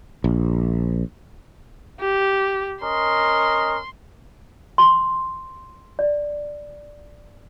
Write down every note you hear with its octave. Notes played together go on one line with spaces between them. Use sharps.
A#1
G4
C#4 A#4 D#5 C6
C6
D5